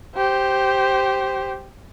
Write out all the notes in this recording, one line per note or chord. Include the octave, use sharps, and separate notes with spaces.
G4 C5